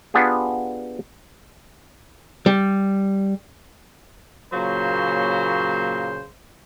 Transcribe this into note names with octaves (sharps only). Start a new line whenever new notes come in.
B3 D4 F4 G4 G#4
G3
A#2 C#3 F#3 A#3 C5